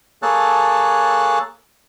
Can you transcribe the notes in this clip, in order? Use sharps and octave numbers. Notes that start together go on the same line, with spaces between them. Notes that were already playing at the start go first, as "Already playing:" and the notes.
A#3 G#4 A4 C#5 A5 F#6